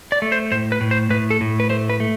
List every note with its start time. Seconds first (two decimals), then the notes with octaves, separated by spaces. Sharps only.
0.12 D5
0.22 A3
0.32 C5
0.52 A2 C5
0.72 B4
0.81 A2
0.91 C5
1.10 A2 B4
1.30 A4
1.41 A2
1.60 B4
1.70 A3 C5
1.90 B4
2.00 A3